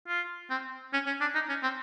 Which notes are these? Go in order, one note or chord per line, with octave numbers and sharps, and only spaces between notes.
F4
C4
C#4
C#4
D4
D#4
C#4
C4